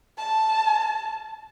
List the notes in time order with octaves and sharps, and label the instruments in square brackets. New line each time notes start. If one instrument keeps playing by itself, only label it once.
[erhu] A5